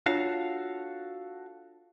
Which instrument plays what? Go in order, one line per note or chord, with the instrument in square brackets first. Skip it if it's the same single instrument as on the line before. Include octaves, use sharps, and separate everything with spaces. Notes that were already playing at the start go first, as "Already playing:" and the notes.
[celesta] D4 F4 C#5 [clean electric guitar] F#4 A4 F5